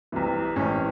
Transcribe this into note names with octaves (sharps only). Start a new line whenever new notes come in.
C2 C3 E3
A1 G#2 E3 C#4